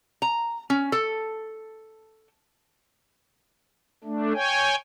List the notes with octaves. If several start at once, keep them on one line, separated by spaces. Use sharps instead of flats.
A#5
C#4
A4
A3 D4
C#5 G5 G#5